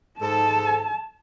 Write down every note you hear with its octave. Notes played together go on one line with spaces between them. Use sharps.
G#2 A4 A5